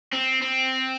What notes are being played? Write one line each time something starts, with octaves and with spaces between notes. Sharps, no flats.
C4
C4